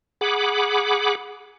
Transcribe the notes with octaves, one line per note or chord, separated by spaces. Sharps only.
G#4 F#5 B5 D6